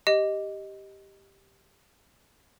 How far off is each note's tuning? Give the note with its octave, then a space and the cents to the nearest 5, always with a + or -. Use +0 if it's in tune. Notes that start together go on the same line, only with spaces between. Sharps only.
G4 +0 D#5 +0